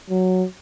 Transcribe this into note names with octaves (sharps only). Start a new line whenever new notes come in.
F#3